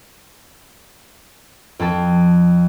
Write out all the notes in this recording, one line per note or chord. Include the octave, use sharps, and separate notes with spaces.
F2 A4